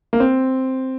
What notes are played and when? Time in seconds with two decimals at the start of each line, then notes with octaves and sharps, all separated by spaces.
0.13 A#3
0.20 C4